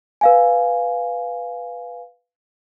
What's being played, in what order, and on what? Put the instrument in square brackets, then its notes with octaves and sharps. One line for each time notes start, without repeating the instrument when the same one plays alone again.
[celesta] B4 F5 G#5